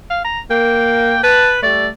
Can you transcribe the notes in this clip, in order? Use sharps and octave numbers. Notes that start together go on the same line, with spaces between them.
F5
A#5
A#3 G5
B4 A5
G3 A3 D5